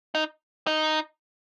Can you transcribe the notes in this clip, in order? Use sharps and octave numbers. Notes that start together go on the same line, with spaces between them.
D#4
D#4